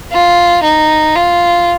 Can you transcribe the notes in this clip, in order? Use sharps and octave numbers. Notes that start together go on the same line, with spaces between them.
F4
D#4
F4